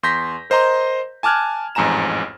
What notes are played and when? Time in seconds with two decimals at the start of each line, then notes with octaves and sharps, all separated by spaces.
0.03 E2 C6 G6 A#6 B6
0.50 A#4 C5 D#5 A#5 C6
1.23 G#5 A5 D6 F6 F#6 G#6
1.75 A1 F2 G#2 G#5 A#5 E7